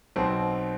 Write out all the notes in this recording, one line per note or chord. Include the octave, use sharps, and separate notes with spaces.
B1 B2 C4